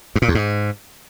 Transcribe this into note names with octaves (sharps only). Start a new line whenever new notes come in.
G2
A#2
E2
G#2